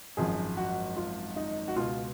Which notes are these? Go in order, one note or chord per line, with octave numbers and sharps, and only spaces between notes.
G#1 F#2 F3 G#4
F#4
F4
D#4
F#4
C#2 B2 F4